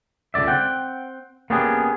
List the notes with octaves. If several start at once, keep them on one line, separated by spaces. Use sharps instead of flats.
C#2 D3 D5 E5
C4 F#5 G5
A#3 B3 C#4 D4 G4 G#4